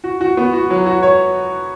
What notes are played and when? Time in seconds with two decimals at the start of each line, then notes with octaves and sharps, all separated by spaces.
0.04 F#4
0.21 F#4
0.37 B3
0.53 F#4
0.70 F#3
0.86 F#4
1.03 C#5